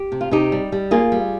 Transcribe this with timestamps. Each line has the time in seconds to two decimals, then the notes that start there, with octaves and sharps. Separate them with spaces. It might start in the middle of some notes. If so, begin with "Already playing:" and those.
Already playing: G4
0.12 C3
0.21 F4
0.31 C3 D#4 G4
0.52 G3
0.72 G3
0.91 A#3 F4 G#4
1.12 G3